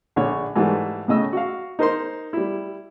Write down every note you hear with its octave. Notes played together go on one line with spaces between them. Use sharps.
A#1 D3 C#5
G#2 E3 G3 A3
A2 C#3 D#5 E6
F#4 F5
D#4 A#4 C5 C6
G3 E4